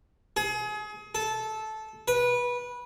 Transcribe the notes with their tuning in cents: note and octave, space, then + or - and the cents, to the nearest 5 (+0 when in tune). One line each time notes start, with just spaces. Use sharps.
G#4 +30
A4 -15
B4 -20